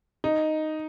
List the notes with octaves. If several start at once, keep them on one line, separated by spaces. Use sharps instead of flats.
D#4